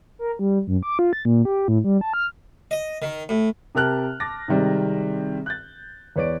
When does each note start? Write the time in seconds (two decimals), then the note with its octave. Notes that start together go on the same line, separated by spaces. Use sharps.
0.19 A#4
0.39 G3
0.67 F#2
0.83 D6
0.99 F4
1.13 A6
1.25 A#2
1.45 G4
1.68 A2
1.84 G3
2.01 A5
2.14 F6
2.71 D#5
3.02 D#3
3.29 A2
3.75 C3 G4 A#4 A5 F6 F#6
4.20 A5 D6 A6 A#6
4.48 C3 D#3 G3 G#3 C4
5.46 F#6 G6 A6
6.16 E2 B4 C#5 D5 D7